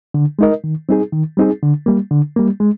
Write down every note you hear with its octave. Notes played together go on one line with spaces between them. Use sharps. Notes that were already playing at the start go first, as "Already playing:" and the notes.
D3
G#3 D#4 A#4 D#5
D#3
G3 C4 D#4 G#4
D#3
G3 C4 D#4 G#4
D3
G3 A#3
D3
G3 A#3
G#3